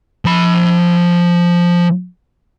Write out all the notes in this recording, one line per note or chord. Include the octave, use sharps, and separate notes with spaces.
F3 B5